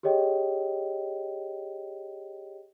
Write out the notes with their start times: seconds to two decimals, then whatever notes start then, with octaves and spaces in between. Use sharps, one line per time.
0.03 G4 G#4 C#5 D#5 G5